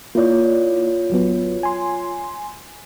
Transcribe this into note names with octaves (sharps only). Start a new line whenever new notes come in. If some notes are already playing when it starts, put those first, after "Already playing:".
A#3 E4 F4 C#5 D5
A1 F#3 B3
G#5 C6